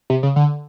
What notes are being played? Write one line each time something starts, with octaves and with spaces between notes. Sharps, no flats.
C3
C#3
D3